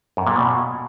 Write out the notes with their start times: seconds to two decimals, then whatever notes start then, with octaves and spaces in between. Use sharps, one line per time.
0.17 F#2
0.26 A#2
0.36 B2